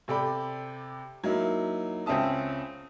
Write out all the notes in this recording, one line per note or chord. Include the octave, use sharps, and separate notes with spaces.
C3 A4 D5 G5 B5
F#3 A#3 D#4 E4
C#2 C4 C#4 E5 A5 D#6